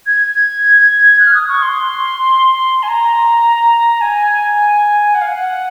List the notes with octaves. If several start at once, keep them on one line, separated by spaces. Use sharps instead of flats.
G#6
F#6
F6
D#6
C#6
C6
G#5
A#5
G#5
F#5
F5
F#5